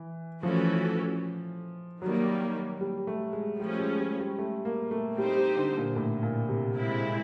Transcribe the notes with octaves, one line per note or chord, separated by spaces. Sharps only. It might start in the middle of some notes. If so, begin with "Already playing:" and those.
Already playing: E3
E3 F3 A3 C#4 F#4 A4
D#3 F#3 G3 A#3
G3
A3
G#3
F3 G3 A3 C#4
G#3
G3
G3
A3
A#3
A3
G3 C4 D#4 G4 C5
G3
D3
A#2
A2
A#2
C3
G#3 C4 E4